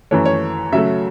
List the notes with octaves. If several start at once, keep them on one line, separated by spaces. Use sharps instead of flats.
F#2 E3 A3 C#5
C#5
C#3 F#3 A3 E5